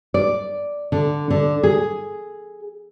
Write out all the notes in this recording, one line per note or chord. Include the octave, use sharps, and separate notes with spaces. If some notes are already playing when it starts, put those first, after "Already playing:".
D5
D3
D3
G#4